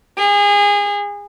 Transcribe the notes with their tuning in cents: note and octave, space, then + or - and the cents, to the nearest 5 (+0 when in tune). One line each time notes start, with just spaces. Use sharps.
G#4 -30